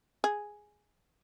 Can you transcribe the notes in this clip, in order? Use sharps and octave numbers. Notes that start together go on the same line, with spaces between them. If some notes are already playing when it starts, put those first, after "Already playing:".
G#4